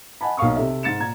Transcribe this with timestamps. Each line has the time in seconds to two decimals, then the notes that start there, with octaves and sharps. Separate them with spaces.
0.21 D#5 F#5 G#5 A5 B5
0.37 B1 A#3 F5 C#6 D#6
0.57 C3 A4 E5
0.83 G#2 A6 C#7 E7
0.99 A#2 A#5 G#6